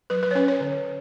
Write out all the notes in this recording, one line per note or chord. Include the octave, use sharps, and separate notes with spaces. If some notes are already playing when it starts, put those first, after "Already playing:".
F#3 B4
B4
C#5
C#4 B4
C#5
D3